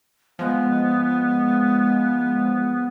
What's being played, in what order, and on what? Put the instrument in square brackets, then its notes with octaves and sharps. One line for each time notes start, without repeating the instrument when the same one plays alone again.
[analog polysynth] F3 G#3 [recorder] B3